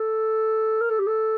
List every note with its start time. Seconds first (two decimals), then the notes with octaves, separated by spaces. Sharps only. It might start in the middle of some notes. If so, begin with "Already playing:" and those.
Already playing: A4
0.81 A#4
0.90 A4
0.99 G4
1.07 A4